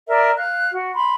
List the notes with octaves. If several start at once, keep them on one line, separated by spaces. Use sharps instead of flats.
A#4 D5 E5
F5 F#6
F#4
B5 C6